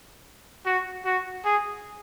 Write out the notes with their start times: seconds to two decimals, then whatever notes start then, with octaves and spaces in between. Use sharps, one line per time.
0.66 F#4
1.05 F#4
1.45 G#4